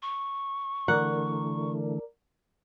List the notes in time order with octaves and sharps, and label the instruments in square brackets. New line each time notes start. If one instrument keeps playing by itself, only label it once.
[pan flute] C#6
[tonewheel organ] D3 E3 A3 [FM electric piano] A#4 D5 [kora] F#5